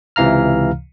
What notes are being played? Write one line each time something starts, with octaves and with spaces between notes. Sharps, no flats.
C#2 C3 E3 F5 A#5 F6